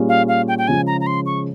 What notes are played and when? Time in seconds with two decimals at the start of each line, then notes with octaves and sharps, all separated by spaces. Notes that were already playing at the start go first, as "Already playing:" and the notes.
Already playing: A#2 G3 C#4 F4 G#4
0.09 F5
0.28 F5
0.48 G5
0.58 G5
0.68 C#3 F3 G#3 G#5
0.87 A#5
1.01 A#5
1.07 C6
1.26 C#6